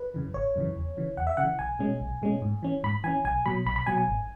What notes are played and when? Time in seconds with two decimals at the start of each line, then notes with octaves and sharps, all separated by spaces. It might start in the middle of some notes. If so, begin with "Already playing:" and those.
Already playing: B4
0.14 F#2 C#3 E3
0.34 G#1 C#5
0.56 F#2 C#3 E3
0.76 E2
0.97 C#3 E3
1.17 E2 F#5
1.27 E5
1.37 C#3 F#5
1.43 E3
1.59 B1 G#5
1.79 B2 G#3 C#4
2.00 B1
2.22 B2 G#3 C#4
2.42 G#2
2.63 E3 C#4
2.84 G#2 B5
3.04 E3 C#4 G#5
3.25 B1 G#5
3.46 B2 F#3 B5
3.66 B1 B5
3.76 B5
3.86 B2 F#3 G#5
3.98 G#5
4.08 G#1